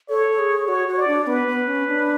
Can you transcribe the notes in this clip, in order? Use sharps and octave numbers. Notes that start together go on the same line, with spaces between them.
A4 C#5
G#4
F#4 C#5
F#4
D5
D4
B3 B4
B3
C#4
D4